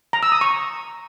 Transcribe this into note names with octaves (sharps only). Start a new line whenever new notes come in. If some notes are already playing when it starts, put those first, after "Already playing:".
A#5
E6
D#6
C#6
A#5